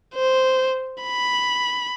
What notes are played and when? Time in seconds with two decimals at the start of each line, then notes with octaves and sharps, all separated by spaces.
0.15 C5
1.03 B5